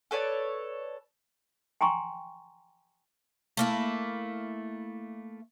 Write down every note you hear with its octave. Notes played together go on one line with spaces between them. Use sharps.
A4 B4 C#5 D5
G5 G#5 A#5 C6 C#6
A3 A#3 E4